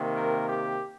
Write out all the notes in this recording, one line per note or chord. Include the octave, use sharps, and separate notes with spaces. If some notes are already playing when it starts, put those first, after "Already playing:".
Already playing: C3 D#3 A#3
A#4
G4